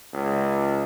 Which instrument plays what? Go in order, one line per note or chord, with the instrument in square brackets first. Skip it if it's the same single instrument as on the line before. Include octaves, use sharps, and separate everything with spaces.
[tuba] C#2